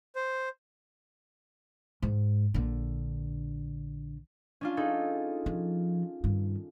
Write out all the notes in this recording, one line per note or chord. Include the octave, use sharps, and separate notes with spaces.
C5
G#2
A#1 D3
C#4 D4 F4
D#4 G#4 A4
F3
G2 D#3